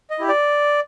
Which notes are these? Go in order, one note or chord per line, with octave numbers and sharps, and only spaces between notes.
D#5
E4 G4
D5